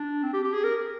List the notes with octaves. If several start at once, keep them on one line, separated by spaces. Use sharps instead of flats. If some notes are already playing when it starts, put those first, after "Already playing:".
Already playing: D4
C4
G4
G4
G#4
A#4